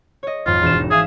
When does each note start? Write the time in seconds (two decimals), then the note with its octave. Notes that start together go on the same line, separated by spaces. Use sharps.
0.23 C#5 D#5
0.46 G#1 F2 F4
0.63 E1 E7
0.79 D#4
0.91 G#4 E5 F5 D#6